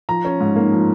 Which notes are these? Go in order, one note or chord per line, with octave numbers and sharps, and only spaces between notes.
F3 A#5
C#4
G#2
A#3
F3